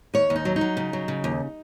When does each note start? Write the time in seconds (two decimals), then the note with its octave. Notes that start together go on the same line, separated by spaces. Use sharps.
0.14 D#2 C#5
0.30 D#2
0.36 D#4
0.45 F#3
0.56 D#4
0.61 F#3
0.77 C#3
0.93 F#3
1.08 C#3
1.24 D#2